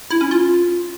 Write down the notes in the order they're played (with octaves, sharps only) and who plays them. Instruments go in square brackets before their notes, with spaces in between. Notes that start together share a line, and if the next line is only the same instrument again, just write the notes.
[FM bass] E4
C#4
F4